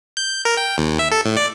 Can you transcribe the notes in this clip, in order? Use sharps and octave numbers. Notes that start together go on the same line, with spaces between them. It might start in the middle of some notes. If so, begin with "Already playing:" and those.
G6
G6
A#4
G5
D#2
E5
A4
A2
D5